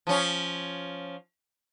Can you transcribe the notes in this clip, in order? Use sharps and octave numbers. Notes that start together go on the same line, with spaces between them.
F3 C#4